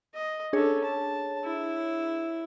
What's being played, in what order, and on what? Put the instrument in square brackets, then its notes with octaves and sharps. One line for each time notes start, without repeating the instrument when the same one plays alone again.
[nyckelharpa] D#5
[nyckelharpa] C#4 A4 [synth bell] D4 G#4 C#5
[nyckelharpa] A5
E4